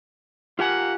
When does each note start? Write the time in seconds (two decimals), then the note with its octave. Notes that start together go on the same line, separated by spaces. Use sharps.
0.59 A#3 F4 G4 F#5 G#5